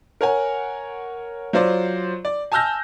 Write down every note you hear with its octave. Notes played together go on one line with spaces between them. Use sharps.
A#4 C#5 F#5 G#5
F#3 F4 C5 D5
D5
G#5 A5 E6 F6 G6 A#6